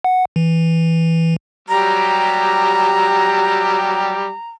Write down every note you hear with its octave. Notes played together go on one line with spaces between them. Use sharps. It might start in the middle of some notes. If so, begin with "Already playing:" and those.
F#5
E3
F#3 G3 G4 A#5